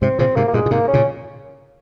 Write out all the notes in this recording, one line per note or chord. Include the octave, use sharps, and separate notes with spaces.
G#2 C3 C4
A#2 C#3 C4
G#2 C3 A#3
A#3
G2 A#2 G#3
A#2
G#2 C3 A#3
C#4
A#2 C#3